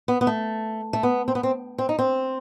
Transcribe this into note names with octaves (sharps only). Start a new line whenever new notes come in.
B3
B3
A3
A3
B3
C4
B3
C4
C4
D#4
C4